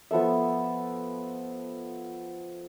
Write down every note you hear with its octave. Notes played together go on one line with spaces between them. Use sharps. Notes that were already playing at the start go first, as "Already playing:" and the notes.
F3 B3 A4 E5